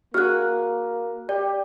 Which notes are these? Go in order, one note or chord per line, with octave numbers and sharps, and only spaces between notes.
A#3 F#4 G#4 F6 F#6
G4 D5